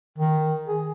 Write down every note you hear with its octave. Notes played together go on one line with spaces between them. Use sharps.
D#3
G#4